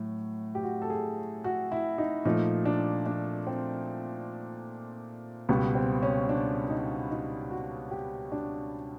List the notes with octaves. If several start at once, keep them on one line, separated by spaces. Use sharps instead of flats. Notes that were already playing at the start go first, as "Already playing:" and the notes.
Already playing: A2 F#3
G4
F#4
A4
G#4
F#4
E4
D#4
A#2 F3 A3 D#4
D4
D4
C4
C#2 B2 G3 B3
C4
C#4
D4
D#4
D#4
F#4
G4
D4